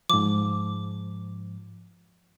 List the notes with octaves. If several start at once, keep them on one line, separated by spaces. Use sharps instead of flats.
G#2 F3 D6